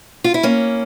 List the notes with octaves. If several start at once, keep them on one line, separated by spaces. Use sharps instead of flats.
F4
E4
A#3 C#4